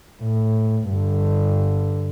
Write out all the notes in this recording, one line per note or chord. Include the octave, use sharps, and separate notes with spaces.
A2
G2 D3